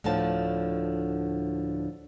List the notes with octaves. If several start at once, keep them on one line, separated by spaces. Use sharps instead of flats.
D2 A2 D3 F3 A5